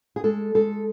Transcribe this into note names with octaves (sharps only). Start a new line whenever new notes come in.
G#4
G#3 A4
G#3 A4